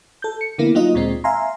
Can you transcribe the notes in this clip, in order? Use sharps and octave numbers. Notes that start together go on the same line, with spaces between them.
A4 G6
C#7
D3 F3 A#3 B3 E4
F#3 A#3 D#4 F4 D#5
D2 A#2 G#3 C4
E5 F5 G#5 A#5 C6